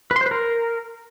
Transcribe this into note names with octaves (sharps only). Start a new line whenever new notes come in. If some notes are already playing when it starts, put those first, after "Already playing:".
B4
C6
C5
B4
A#4